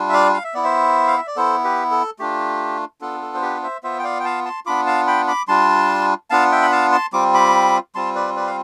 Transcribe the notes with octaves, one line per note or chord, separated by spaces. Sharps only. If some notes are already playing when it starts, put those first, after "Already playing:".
Already playing: G3 D4 F4
E5
D5 F5
F5
E5
B3 E4 D5
C5 E5
F5
E5
D5
B3 E4 A4 C5
G4 B4
A4
A3 D4 F4 G4
B3 D4 F4 A4
A4
C5
G4 B4
C5 E5
B3 F4 C5 E5
G5
D5 F5
G5
F5 A5
A5 C6
B3 D4 F4 B5 D6
F5 A5
G5 B5
B5 D6
G3 D4 F4 A5 C6
B3 D4 F4 F5 A5
E5 G5
B5
F5 A5
A5 C6
G3 C4 F4 D6
B5 D6
G3 C4 F4 A5 C6
B4 D5
B4 D5
F5